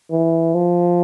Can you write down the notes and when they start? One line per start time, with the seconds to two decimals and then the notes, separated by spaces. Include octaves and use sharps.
0.11 E3
0.54 F3